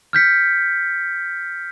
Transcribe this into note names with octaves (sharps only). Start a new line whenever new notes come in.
F6 G6 B6 C#7